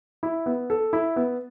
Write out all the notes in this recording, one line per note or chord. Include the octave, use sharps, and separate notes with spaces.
E4
B3
A4
E4
B3